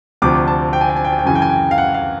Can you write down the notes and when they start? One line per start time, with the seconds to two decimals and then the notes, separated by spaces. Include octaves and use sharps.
0.22 D2 C3 F3 D6
0.48 A5
0.73 G5
0.81 G#5
0.89 G5
0.96 G#5
1.05 G5
1.12 G#5
1.19 G5
1.25 F#2 C#3 E3 G#5
1.35 G5
1.42 G#5
1.50 G5
1.71 F5
1.78 F#5
1.94 F5